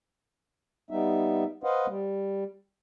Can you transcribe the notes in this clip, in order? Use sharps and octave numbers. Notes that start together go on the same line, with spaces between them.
G3 B3 D#4 E5
B4 C5 D#5 F5 F#5
G3